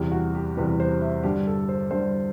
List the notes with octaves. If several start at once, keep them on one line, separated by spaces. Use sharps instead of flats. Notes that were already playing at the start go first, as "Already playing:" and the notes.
Already playing: E2 C3 E3 G3
F#4
G4
E2 C3 E3 G3 B4
C5
E5
G2 D3 G3 G4
A4
C5
G2 D3 G3 C5